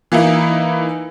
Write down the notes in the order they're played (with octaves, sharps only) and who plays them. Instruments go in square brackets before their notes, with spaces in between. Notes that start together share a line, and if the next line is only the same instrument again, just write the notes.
[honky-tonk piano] E3 A#3 D#4 E4